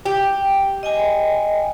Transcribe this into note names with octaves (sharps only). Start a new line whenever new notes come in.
G4
D#5 G5 G#5